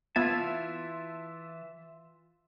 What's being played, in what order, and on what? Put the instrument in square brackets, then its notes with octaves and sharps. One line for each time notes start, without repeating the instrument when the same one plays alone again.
[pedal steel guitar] E3 A5 [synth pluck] B3 G#6 [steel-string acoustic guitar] F4 [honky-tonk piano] E5